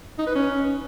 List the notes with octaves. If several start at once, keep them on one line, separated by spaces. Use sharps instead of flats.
D#4
B4
C#4